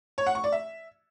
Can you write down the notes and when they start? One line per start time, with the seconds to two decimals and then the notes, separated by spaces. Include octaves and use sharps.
0.18 C#5
0.26 F#5
0.35 C#6
0.44 D5
0.52 E5